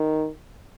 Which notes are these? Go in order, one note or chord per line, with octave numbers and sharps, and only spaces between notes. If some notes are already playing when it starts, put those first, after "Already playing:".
Already playing: D#3